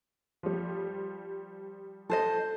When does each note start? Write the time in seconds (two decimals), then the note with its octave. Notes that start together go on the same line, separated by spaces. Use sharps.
0.43 F3 G3
2.10 A4 C5 D#5